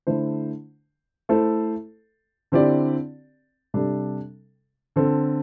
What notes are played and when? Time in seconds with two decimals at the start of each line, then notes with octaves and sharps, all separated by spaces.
0.07 D3 A3 E4 C5
1.29 A3 E4 A4 C5
2.52 D3 C4 E4 G4 D5
3.74 C3 G3 D4 A4
4.96 D3 C4 A4